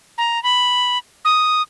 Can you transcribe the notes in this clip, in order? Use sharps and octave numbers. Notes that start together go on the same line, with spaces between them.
A#5
B5
D#6